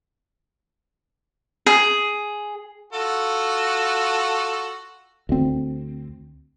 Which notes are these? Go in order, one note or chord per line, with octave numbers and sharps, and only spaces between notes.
G#4
F4 F#4 A4
D2 C4